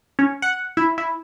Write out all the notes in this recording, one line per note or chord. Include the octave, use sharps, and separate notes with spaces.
C#4
F#5
E4
E4